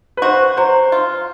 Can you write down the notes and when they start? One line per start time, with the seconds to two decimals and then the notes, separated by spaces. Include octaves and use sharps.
0.17 B4
0.22 F#4 C5
0.57 F#3 C5
0.92 F4